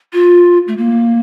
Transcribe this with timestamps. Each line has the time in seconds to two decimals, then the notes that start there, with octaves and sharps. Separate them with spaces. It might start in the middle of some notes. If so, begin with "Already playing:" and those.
0.13 F4
0.68 A3
0.77 A#3